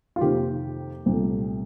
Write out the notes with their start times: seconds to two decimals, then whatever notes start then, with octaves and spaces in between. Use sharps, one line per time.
0.16 F4
0.21 F2 C3 D#3 A#3 G4
1.06 C2 A#2 A3